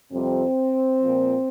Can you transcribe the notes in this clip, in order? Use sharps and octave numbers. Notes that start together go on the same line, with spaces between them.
F2 C3 G3 C4
A#2 F3